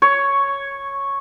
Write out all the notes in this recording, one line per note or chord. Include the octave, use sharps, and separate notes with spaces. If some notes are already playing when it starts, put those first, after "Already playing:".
C#5